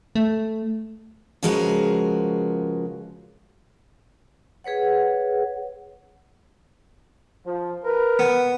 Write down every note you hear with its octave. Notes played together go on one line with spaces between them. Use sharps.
A3
C#3 F3 G#3 F#4 A#4 B4
G#4 B4 C#5 F#5
F3
A#4 B4
B3